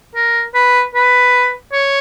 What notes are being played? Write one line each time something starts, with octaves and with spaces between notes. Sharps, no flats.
A#4
B4
B4
C#5